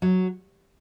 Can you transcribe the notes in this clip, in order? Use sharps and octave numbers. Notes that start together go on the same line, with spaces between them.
F#3